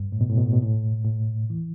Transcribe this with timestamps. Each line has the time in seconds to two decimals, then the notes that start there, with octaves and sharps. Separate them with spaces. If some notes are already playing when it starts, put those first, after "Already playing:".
Already playing: G2
0.12 A2
0.21 B2
0.29 A2
0.38 B2
0.46 A2
0.53 B2
0.62 A2
1.05 A2
1.50 E3